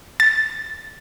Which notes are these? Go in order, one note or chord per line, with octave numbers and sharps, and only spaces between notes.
A6